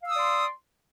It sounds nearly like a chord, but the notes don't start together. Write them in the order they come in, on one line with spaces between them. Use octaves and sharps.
F5 E6 D#6 D5 C6